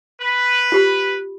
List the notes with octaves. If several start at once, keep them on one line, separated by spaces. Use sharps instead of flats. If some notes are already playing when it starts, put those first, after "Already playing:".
B4
F4 G4 B5